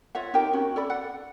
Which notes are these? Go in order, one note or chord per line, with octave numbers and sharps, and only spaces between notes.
F4 C#5 E5 F#5
D#4 G4 A#4 G5
C#4 F#4
A4 D5 B5
F#5